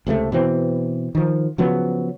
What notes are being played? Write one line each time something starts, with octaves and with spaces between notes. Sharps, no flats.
C#2 C3 D#3 A3
B2 E3 C4
D#3 F3
C#3 F3 F#3 B3